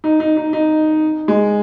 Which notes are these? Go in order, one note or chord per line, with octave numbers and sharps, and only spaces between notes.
D#4
D#4
D#4
D#4
G#3